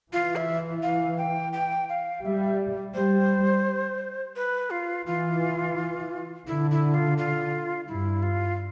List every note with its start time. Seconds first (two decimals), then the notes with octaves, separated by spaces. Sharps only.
0.13 E3 F4
0.36 E5
0.83 F5
1.18 G5
1.53 G5
1.89 F5
2.24 G3 E5
2.94 G3 C5
4.36 B4
4.70 F4
5.06 E3 F4
6.47 D3 E4
6.71 E4
6.94 F4
7.18 F4
7.88 G2 E4
8.23 F4